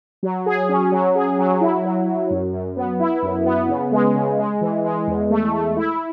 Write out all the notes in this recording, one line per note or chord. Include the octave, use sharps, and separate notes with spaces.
F#3
G#4
C#4
F#3
G#4
F#3
E4
F#3
F#3
F#2
F#2
B3
E4
F#2
B3
C#3
G#3
C#3
G#3
E3
G#3
E2
A3
A3
E4